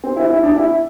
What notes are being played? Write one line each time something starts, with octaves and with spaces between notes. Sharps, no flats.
C4
E4
E4
D4
E4